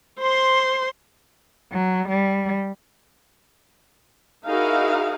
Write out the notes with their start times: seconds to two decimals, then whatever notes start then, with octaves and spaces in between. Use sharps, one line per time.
0.19 C5 C6
1.72 F#3
2.08 G3
4.46 D#4 E4 F#4 G#4 A#4 F5